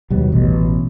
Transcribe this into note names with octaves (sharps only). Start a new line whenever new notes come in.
D#2 B2 F#3 G3
A1 B2